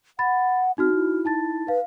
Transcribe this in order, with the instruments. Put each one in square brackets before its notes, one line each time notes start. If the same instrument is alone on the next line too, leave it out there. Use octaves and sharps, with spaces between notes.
[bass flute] F#5 [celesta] B5 A6
[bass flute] C4 [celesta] D#4 F#4 F6
[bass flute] E4
[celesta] D#4 A5 A6
[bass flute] B4 [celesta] F5